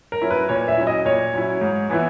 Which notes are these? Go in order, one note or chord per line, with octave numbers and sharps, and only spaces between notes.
A#4
F#3 C#4 E4
B4
A#2 C#5
E5
F#3 C#4 E4
D#5
A#2 C#5
F#3 C#4 E4
G#2
E3 B3 E4